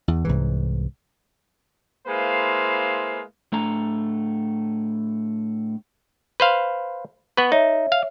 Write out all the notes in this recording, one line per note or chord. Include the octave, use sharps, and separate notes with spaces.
E2
C2 G#2 E3
G#3 A#3 E4 B4 C5 F5
A2 A3 D4 A#5
B4 C5 F5
B3 B4 C#6
D#4 C#5 E5
F5